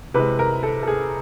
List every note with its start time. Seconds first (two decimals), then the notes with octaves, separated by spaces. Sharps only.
0.14 C3 E3 G#3 B4
0.39 A#4
0.63 A4
0.83 A4
0.87 G#4